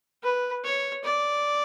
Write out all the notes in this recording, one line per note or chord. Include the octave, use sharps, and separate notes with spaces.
B4
C#5
D5